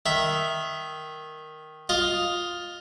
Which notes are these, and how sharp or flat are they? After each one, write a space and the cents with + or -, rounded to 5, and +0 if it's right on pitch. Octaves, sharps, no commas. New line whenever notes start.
D#3 +0 E5 +0
F4 +10 D#5 +0